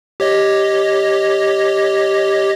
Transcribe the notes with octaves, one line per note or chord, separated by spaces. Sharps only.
G4 C#5 D#5